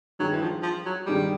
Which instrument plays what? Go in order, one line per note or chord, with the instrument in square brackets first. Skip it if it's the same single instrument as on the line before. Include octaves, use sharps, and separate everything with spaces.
[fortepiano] G2 D#3 G#3 [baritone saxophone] F#3
[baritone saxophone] E3
F3
F3
F#3
[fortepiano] G2 D#3 G#3 [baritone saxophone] G3